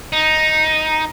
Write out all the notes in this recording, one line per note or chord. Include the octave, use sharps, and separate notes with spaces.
D#4